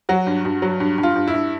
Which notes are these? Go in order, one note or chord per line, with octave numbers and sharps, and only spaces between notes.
F#3 F#4
G2
G2
F#3
G2
G2
F4
G2
E4
G2